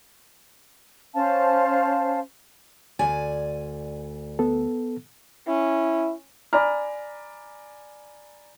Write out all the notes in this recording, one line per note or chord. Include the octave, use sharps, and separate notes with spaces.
C#4 C5 F5 A5
D2 D5 G#5
B3 A4
C#4 E4
D5 G#5 A#5 B5 F6